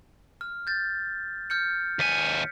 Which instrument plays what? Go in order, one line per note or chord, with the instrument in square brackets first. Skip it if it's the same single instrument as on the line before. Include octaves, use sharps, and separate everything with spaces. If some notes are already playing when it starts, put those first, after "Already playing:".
[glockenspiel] F6
G6 A6
F6 G6 C#7
[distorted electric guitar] D#2 G#5 [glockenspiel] B6 C#7